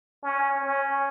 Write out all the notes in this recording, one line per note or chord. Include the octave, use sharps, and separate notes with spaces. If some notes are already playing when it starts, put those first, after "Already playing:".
C#4
C#4